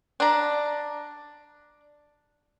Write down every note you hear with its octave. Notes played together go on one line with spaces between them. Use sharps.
D4 A#5